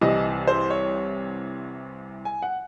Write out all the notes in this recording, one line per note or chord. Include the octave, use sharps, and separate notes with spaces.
C2 C3 E3 D#5
C5
C#5
G#5
F#5